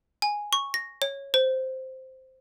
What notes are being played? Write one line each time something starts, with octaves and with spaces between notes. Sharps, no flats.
G#5
C#6
A#6
C#5
C5